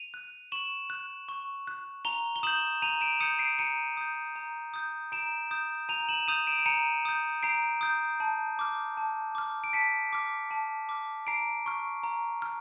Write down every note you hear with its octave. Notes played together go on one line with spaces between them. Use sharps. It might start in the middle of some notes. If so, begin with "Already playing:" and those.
Already playing: D#7 F7
F#6
C#6 E7 F#7
F#6
C#6
F#6
A#5 F7 G7
G7
D#6 G6 E7 F#7
A#5 D#7 F7
D7 E7
D#6 G6 C#7 D#7
C7 D7
A#5 C#7 D#7
D#6 G6
A#5
D#6 G6
A#5 D7 E7
D#6 G6
A#5 D#7 F7
E7 F#7
D#6 G6 D#7 F7
D7 E7
D7
A#5 C#7 D#7
D#6 G6
A#5 C7 D7
D#6 G6
A5
D6 F6
A5
D6 F6
D7
A5 B6 C#7
D6 F6
A5
D6 F6
A#5 C7 D7
C#6 F6
A#5
F6